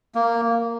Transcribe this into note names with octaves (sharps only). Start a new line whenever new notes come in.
A#3